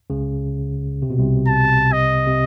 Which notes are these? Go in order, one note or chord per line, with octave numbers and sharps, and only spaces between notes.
C#2 C#3
C3
B2
C2 C3
A5
D#5
C3